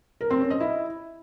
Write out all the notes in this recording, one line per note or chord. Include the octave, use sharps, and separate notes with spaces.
A#4
C4
C#4
D#5
E4